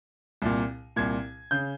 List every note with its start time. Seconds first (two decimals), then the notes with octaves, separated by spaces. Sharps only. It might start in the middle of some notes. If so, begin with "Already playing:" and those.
0.42 C2 A#2
0.96 C2 A#2 G#6
1.51 C#3 G6